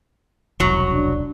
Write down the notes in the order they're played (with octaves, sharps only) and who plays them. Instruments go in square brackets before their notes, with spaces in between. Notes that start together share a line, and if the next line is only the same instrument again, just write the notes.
[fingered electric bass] E1 C2 [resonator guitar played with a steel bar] F#2 F#3
[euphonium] D4